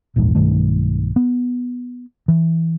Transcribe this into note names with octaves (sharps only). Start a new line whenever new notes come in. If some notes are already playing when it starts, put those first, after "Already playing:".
D#1 A#1 E2 G#2
B1 G2 D#3 A3
B3
E3